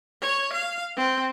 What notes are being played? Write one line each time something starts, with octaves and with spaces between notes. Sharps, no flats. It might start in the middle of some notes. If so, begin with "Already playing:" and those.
C#5
F5
C4